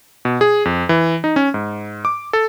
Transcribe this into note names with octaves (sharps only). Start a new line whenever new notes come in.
B2
G#4
F2
E3
D#4
C#4
G#2
D6
A4